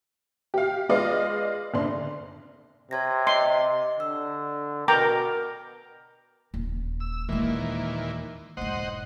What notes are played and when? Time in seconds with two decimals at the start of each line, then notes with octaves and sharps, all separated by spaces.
0.54 G4 F5
0.89 G#3 F4 B4 D5 D#5 F5
1.74 F#1 D3 D4 C6
2.91 C3 C#5 G#6 A#6
3.27 D#5 C6
4.00 D3 E6
4.88 B2 A#4 G5 A#5 D6
6.54 D#1
7.00 E6
7.29 D#2 A#2 E3 G#3 A#3
8.57 E1 G#2 C5 D#5 F#5